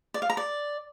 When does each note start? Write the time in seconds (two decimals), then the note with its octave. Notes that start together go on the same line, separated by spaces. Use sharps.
0.14 D5
0.22 F5
0.30 A#5
0.37 D5